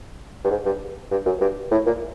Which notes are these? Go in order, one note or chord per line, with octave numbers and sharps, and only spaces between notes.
G2
G#2
G2
G2
F#2
G2
A2
A#2